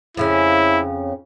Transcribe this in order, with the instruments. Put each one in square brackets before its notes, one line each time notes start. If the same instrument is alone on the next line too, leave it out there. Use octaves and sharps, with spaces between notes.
[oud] F2 C#3 C#4 [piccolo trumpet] E4